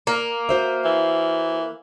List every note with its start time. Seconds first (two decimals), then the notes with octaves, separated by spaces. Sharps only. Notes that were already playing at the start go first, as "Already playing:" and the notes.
0.07 A#3
0.49 F#4 C5 E5
0.85 E3